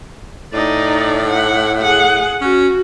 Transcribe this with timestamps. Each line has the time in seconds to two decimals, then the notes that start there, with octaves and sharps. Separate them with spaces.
0.53 A2 D#4 D5
1.30 F#5
1.82 G#4 F#5
2.41 C#4 F#4